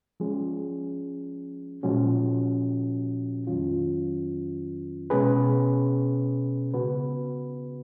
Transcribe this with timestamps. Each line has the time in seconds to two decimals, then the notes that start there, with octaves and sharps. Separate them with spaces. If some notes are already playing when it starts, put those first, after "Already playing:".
0.20 F3 G#3 C#4 G#4
1.83 A#2 F3 G#3 C#4 F#4
3.47 F2 D#3 F#3 C#4 F4
5.10 B2 G#3 C#4 G#4 B4
6.74 C#3 G#3 B3 F#4 B4